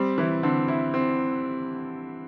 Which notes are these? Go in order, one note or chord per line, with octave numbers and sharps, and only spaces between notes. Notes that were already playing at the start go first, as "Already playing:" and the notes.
Already playing: G3 C4
E3 E4
D3 C4
E4
C4